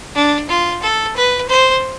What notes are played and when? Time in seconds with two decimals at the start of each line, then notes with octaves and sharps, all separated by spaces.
0.15 D4
0.49 F4
0.83 A4
1.16 B4
1.49 C5